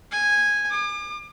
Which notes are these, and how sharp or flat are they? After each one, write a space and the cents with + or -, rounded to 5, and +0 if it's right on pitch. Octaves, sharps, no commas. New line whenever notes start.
G#5 -10
D6 +40